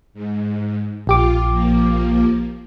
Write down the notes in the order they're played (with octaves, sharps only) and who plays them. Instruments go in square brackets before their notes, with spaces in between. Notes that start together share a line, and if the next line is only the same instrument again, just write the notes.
[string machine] G#2
[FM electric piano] A#1 G4 D6 [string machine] F4
[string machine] F3 A#3